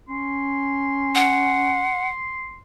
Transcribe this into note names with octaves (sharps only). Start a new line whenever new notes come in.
C#4 C6
F#5